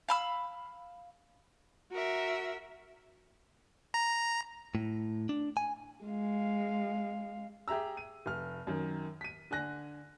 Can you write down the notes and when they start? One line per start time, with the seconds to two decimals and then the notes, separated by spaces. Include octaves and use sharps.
0.08 F5 B5 E6
1.92 F#4 A#4 E5
3.94 A#5
4.75 A2
5.29 D4
5.57 G#5
6.04 G#3 F5
7.68 G4 G#4 E5 A#5 E6
7.97 D#7
8.26 F1 F6
8.67 F#2 D#3
9.21 B6 D#7
9.51 D3 G#5 F#6 A#6